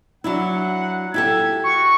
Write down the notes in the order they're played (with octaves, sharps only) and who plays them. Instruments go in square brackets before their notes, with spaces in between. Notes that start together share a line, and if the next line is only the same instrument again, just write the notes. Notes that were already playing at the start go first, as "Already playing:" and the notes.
[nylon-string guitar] F#3 D4 E4 [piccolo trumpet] F#5
[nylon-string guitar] E4 G4 A4 [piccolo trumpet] G#6
[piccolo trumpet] F#4 [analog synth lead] C#6